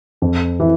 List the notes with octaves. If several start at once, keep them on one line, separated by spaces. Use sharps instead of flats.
F2
E3